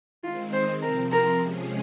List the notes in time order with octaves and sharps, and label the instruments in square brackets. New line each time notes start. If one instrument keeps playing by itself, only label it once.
[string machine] D#3 G#3 C4 [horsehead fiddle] F4
[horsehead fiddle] C5
[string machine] C3 F3 C4 [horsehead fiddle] A#4
[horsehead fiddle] A#4
[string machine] C3 F3 G#3 C#4 G#4